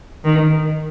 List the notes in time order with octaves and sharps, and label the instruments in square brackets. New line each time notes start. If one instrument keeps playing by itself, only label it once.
[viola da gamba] D#3